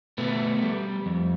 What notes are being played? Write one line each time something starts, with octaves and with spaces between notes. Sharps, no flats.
B2 A3 B3
G3
F2